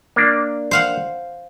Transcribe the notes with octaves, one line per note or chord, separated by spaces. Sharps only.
A#3 D4
C5 F5 F#5